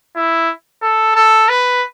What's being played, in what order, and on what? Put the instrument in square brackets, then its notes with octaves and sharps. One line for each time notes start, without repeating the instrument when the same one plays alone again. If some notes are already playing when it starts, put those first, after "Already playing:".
[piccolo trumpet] E4
A4
A4
B4